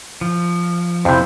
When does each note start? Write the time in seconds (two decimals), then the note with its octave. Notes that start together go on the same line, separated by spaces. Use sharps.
0.21 F3
1.05 F2 C3 E4 C5